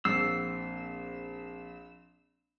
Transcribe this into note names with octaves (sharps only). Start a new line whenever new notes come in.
A#1 C4 E6 C7